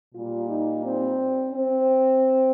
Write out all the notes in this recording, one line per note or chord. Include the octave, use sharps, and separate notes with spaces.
A#2 G3 F4
D#4
C4
C4